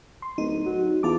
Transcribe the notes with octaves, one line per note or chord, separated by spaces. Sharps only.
C6
D1 D#4
F#3
E2 F4 A5 D6